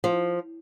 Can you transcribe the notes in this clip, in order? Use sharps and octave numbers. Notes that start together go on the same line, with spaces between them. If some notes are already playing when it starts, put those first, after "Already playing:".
F3